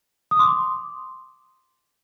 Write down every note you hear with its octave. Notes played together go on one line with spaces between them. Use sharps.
D#6
C6 D6